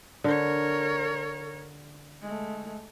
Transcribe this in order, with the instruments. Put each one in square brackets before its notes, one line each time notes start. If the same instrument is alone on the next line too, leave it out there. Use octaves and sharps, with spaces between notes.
[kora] D3 [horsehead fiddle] A#4 C#5
[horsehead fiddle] G#3 A3